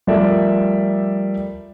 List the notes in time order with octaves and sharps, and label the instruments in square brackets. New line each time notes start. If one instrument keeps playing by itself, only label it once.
[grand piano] F3 G3 A3 A#4 D5 E5